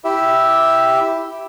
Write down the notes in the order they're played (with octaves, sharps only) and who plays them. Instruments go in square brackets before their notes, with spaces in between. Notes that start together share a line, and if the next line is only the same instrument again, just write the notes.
[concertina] E4 G4 E5